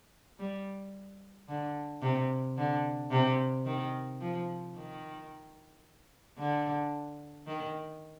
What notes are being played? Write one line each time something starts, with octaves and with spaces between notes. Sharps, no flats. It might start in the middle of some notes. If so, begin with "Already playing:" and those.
G3
D3
C3
D3
C3
D#3
F3
D#3
D3
D#3